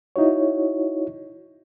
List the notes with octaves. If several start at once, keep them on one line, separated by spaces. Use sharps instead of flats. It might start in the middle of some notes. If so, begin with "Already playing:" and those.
D#4 E4 F#4 C#5